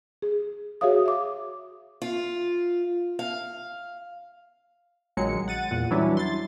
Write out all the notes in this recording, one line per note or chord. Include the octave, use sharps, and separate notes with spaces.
G#4
F#4 G#4 C#5 E5 F5 D#6
E5 D6
F4
F5
A#1 D#3 F#3 G#3 C#7
F#5 A6 D#7
E2 A#2 F#5
E3 F#3 G3 C#4 D4 E4
C6 A6